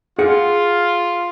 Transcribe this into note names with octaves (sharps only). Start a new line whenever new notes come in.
F4 G#4 F#5